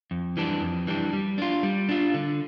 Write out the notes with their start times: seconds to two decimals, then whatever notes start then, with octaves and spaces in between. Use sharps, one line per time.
0.11 F2
0.37 E3 G3 D4
0.61 F2
0.87 E3 G3 D4
1.13 G3
1.38 D4 F4
1.63 G3
1.89 D4 F4
2.14 D3